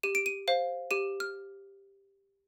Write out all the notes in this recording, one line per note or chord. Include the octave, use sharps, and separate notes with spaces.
G4 D#7
D7
D#7
C5 F5
G4 D#7
F6